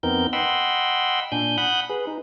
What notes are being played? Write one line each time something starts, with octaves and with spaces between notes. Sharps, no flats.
F2 B3 C4 D#4 A#4 G6
D#5 F#5 G5 B5 C6 E6
A#2 D4 G#5 G6
F#5 B5 D#6 F#6 G6
G#4 B4
D#4